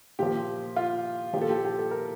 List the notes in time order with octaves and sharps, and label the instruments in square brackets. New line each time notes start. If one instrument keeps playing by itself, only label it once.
[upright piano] A#2 F3 G4
F4
A#2 F3 G4
A4
G4
G4
A4
A#4